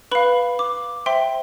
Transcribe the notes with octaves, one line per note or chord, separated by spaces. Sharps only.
B4 F5 B5
D6
C5 E5 G5 C6